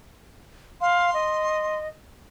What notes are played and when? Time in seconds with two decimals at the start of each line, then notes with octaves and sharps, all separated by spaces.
0.81 F5 C6
1.14 D#5